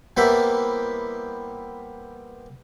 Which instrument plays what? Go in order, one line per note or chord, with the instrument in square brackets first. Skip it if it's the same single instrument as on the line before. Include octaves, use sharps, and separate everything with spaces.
[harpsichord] G3 A#3 B3 E4 C5 B5